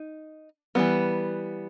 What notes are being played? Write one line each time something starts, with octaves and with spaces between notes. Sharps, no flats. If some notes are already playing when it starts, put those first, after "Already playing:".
Already playing: D#4
E3 G3 B3